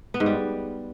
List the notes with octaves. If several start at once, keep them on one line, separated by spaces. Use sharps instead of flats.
B3
G#2
G3